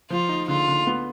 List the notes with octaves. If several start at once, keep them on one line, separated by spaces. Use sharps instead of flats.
F3 F4
D#4
D3 F4
D3
B3